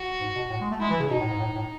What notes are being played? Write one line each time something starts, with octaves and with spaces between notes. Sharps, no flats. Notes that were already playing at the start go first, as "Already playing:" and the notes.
Already playing: F#4
G#2
B2
A2
G#3
A3
G#3 E4
E3
C#3
B2 D#4
A2
G#2
A2
A2